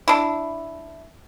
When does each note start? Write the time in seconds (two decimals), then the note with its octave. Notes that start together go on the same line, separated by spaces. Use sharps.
0.08 D4 E4